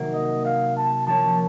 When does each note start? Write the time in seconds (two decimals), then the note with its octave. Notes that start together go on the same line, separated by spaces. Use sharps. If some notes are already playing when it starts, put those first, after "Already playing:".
Already playing: C3 D#3 F#3 A#3
0.14 D#5
0.45 F5
0.77 A5
1.07 F3 A#3 C#4 A5